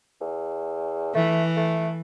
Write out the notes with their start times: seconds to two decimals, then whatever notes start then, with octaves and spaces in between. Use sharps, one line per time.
0.21 E2
1.15 E3 A3
1.57 A3